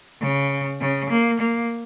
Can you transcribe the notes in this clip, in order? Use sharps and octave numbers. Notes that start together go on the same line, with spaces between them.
C#3
C#3
A#3
A#3